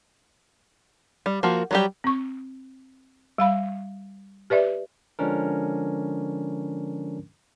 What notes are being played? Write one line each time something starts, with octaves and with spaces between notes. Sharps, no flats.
G3
F3 A#3 F#4
F#3 G3 G4
C4 C#6
G3 F5 B5
G4 B4 D5 E5
D3 F3 G#3 C#4 D4 A#4